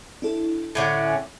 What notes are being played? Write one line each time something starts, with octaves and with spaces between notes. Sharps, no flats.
D4 E4 A4
A2 D3 C#4